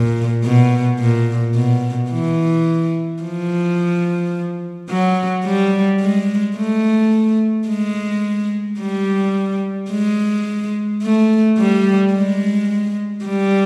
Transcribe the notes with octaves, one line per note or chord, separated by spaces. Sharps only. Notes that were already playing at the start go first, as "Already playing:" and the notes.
Already playing: A#2
B2
A#2
B2
E3
F3
F#3
G3
G#3
A3
G#3
G3
G#3
A3
G3
G#3
G3